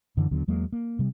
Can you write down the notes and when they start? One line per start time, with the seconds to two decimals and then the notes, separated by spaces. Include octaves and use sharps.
0.17 F#2 D3 E3
0.31 D#2 D3 F#3 B3
0.48 E2 F#3 G#3 A#3
0.72 A#3
0.99 C3 G3